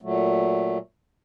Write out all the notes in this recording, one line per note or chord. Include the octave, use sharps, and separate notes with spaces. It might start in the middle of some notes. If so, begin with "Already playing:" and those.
A#2 F#3 A3